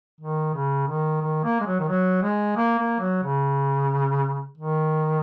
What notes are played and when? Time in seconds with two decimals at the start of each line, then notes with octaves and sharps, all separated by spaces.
0.20 D#3
0.54 C#3
0.87 D#3
1.22 D#3
1.44 A#3
1.61 G#3
1.66 F#3
1.79 D#3
1.89 F#3
2.22 G#3
2.56 A#3
2.79 A#3
3.00 F#3
3.23 C#3
4.57 D#3